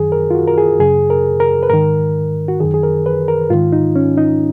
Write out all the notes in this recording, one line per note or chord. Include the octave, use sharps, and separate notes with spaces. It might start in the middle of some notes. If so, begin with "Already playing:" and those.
Already playing: F#2 D#3 G#4
A#4
F4
F#4
A#4
G#4
F#2 C#3 G#4
A#4
A#4
B4
G#2 D#3 A#4
F#4
F#2 D#3 G#4
G#4
A#4
B4
A#4
G#2 D#3 F4
D#4
C#4
D#4